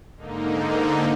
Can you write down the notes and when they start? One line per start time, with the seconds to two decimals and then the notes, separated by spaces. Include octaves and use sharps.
0.17 G#2 D3 A#3 D#4